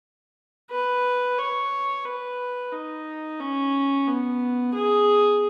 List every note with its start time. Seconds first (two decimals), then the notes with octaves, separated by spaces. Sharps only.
0.71 B4
1.38 C#5
2.05 B4
2.72 D#4
3.40 C#4
4.07 B3
4.74 G#4